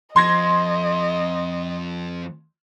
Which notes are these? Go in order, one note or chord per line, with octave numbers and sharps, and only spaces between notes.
F2 F3 D#5 C6 G#6 A#6